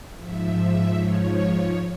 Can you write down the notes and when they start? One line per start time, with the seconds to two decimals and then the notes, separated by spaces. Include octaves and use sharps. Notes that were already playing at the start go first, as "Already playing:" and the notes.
0.17 G#2 F3 E5
0.57 E5
0.95 G#2 F3 C#5